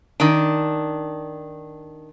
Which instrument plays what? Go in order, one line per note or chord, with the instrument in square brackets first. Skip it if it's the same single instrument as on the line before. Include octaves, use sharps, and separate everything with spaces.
[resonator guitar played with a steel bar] D#3 D4